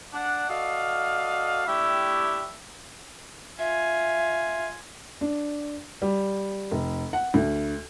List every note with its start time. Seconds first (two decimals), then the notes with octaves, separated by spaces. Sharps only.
0.13 D4 F#5
0.49 F#4 A4 D5 D#5 F5
1.67 G3 A3 D4 E4 G4 E5
3.59 F4 E5 G#5
5.21 D4
6.02 G3
6.71 F1
7.13 F#5
7.34 D2